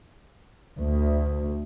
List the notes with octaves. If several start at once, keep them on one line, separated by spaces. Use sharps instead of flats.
D2